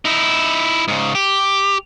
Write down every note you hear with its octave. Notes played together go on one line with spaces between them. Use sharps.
D#4 E4
G#2 C#3
G4